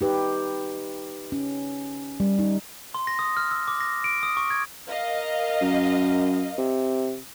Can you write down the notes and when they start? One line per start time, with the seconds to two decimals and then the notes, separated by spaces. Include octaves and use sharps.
0.01 D#4 G4 B4
1.32 C#4
2.20 G3
2.39 D#4
2.94 C6
3.07 A#6
3.19 D#6
3.37 F6
3.51 E6
3.68 D6
3.80 A#6
4.04 D7
4.23 D#6
4.37 C#6
4.50 G#6
4.89 A#4 D#5 F5
5.61 F#2
6.58 C3